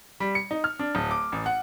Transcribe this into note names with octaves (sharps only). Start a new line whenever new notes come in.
G3
C#7
D#4
F6
D4
D1
D6
A1
F#5